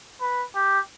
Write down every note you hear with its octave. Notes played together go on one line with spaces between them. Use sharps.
B4
G4